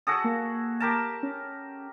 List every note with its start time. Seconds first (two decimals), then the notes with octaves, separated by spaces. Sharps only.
0.07 F#4 G#4 A4 D#6 A#6
0.24 A#3
0.80 G4 A#4 A5
1.23 C#4